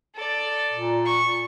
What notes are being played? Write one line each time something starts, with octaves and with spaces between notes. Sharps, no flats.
A4 D5
A#2
C#6